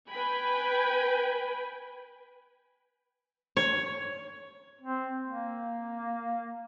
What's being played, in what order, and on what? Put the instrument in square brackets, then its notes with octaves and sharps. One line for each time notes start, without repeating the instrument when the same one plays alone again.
[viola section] B4 G5 G#5 B5
[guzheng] C#5
[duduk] C4
A#3